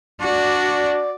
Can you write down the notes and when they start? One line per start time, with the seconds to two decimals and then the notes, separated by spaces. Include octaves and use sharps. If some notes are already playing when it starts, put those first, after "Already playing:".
0.21 D4 F#4 D5